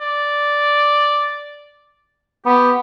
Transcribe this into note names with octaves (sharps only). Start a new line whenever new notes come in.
D5
B3 G4